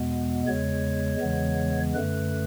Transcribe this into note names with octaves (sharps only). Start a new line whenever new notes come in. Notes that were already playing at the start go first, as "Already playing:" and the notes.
Already playing: E2 B2 G#3 B3
E2 C#3 G#3 C#5
E2 C#3 E3 G#3 B3
F#2 D3 A3 B4